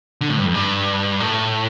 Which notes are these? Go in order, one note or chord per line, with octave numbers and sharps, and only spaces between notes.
D3
A2
G2
F2
G2
A2